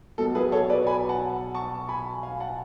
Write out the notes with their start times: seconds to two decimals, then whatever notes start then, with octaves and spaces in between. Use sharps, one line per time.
0.18 B1 B2 F#3 A4
0.35 G#4 B4
0.52 A4 C#5
0.69 B4 D5
0.87 G#5 B5
1.09 F#5 A5
1.54 A5 C#6
1.89 G#5 B5
2.23 F5 G#5
2.40 F#5 A5